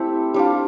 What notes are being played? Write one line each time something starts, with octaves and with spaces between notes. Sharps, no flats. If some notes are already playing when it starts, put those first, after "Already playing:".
Already playing: A3 C4 E4 G4
G3 D4 F4